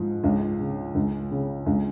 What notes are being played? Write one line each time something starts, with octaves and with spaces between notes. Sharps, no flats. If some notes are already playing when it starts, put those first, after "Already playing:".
Already playing: G#2 F3
C#2
C#3
C#2
C#3
C#2